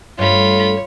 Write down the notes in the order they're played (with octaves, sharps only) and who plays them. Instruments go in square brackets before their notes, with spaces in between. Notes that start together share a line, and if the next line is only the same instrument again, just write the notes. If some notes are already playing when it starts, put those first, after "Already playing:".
[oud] G2 A3 [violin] F4 B5 [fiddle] C#5